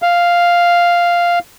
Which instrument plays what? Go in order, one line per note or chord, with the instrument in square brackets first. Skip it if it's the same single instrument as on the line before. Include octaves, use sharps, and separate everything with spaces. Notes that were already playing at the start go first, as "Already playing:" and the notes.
[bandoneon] F5